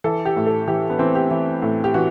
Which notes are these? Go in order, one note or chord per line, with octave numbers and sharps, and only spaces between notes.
E3 A4
G4
A2
A4
E3 G4
B3
E3 C4
G4
E3
A2
G4
E3 F#4